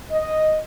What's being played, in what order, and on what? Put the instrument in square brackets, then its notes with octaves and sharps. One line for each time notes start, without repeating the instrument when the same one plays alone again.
[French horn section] D#5